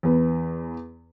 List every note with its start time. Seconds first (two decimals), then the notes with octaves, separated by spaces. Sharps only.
0.03 E2 B4